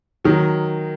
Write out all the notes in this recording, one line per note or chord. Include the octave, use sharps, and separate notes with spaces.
D#3 F#3